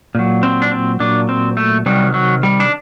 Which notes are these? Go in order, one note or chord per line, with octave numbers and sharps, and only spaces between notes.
A#2 F#3
C4
D4
C4
A#2 F#3 D4
C4
A3
C3 D#3 F#3 G3
F#3
G3
D4